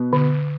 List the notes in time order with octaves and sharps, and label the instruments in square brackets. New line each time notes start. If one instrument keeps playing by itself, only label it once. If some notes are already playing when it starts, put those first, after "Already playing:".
Already playing: [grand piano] B2 B3
[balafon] D3